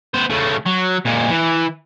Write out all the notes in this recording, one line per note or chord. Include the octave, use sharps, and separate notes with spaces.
B3 C5
C#3 A3
F#3
A#2 G#3
E3